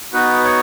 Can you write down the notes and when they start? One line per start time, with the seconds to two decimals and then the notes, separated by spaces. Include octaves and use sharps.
0.13 B3 D#4 F#4 B4
0.44 C#5